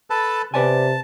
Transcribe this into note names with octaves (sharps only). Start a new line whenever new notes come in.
A4 B4 A5
C3 B4 D5 G#5 A5